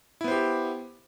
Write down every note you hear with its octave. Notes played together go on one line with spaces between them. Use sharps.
B3 E4 G4 C5